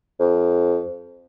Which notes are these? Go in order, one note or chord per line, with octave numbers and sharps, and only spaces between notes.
F2